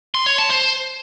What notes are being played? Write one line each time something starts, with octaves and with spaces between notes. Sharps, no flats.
C6
C#5
A5
C5